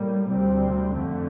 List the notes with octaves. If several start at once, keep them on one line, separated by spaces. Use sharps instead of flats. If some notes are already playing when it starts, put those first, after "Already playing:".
Already playing: A2 G3 A#3
D2 C3 G3 C4
F2 D3 A3